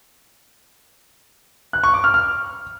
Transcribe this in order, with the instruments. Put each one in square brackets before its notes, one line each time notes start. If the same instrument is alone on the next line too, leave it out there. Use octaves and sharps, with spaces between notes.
[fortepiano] F#6
C#6
D6
F6
F6